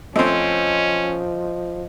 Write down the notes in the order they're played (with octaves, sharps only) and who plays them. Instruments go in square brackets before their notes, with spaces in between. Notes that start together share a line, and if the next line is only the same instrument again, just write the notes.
[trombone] F3 [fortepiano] A3 C4 [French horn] C#4 [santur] D#5